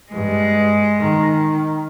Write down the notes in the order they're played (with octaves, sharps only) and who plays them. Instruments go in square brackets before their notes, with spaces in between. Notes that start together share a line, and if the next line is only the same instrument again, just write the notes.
[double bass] G2 [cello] G#3
[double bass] D#3